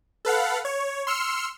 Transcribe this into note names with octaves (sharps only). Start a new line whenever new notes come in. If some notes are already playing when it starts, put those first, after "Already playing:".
A4 B4 F5 F#5
C#5
C6 E6 F6 C#7